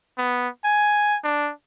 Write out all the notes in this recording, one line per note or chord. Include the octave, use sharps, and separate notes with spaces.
B3
G#5
D4